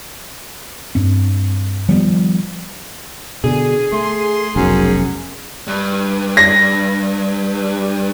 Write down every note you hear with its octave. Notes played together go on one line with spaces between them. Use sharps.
G2 C4
D#3 F3 G3 B3
B2 D3 G#4
A3 C6
F1 B1 F#2
G2
A#6